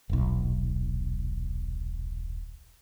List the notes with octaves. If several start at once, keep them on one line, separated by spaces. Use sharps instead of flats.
D#1 B1